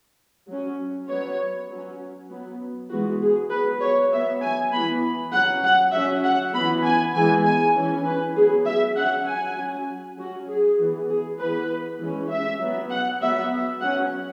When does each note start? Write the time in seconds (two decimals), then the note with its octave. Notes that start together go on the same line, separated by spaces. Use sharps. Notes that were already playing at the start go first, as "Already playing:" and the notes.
0.48 F#3 C#4
1.09 F#3 B3 C#5
1.70 F#3 C#4
2.30 F#3 B3
2.90 E3 G#3 B3 F#4
3.22 G#4
3.51 F#3 B3 B4
3.81 C#5
4.12 F#3 B3 E5
4.42 G#5
4.72 E3 B3 B5
5.33 F#3 C#4 F#5
5.64 F#5
5.93 F#3 C#4 E5
6.24 F#5
6.54 E3 B3 B5
6.84 G#5
7.15 E3 G#3 B3 G#5
7.45 G#5
7.76 E3 C#4
8.06 B4
8.36 F#3 B3 G#4
8.66 E5
8.97 F#3 C#4 F#5
9.27 G#5
9.57 F#3 C#4
10.17 F#3 C#4 F#4
10.48 G#4
10.79 E3 B3
11.09 G#4
11.38 E3 B3 B4
12.00 E3 G#3 C#4
12.30 E5
12.60 F#3 B3
12.91 F#5
13.21 F#3 B3 E5
13.81 F#3 C#4 F#5